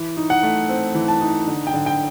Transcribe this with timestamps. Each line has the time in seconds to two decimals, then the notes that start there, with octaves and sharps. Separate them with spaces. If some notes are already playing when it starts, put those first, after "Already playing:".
Already playing: E3
0.17 D#4
0.30 F#5
0.43 A3
0.69 C4
0.95 E3
1.08 A5
1.21 D#4
1.47 D3
1.67 G5
1.74 D3
1.86 G5